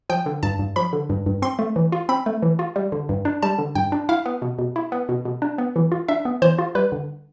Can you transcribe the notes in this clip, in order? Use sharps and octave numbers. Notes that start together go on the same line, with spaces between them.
F3 G5
D3
G2 A5
G2
F3 B5
D3
G2
G2
C4 C6
A3
E3
F4
C4 B5
A3
E3
F4
G3
D3
G2
D4
G3 A5
D3
G2 G5
D4
E4 F5
B3
B2
B2
E4
B3
B2
B2
D4
B3
E3
F4
D4 E5
B3
E3 C5
F4
G3 B4
D3